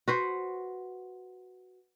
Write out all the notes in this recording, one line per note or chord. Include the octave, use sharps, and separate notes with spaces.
F#4 B4 C5